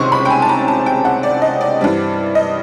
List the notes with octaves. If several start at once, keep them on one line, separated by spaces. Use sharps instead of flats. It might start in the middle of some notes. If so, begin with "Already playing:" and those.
Already playing: C#2 C3 D#3 G#3 C4 C6 C#6
B5
G5
G#5
A5
A#5
A5
G5
F#5
D5
D#5
D5
G2 E3 G3 C4
D#5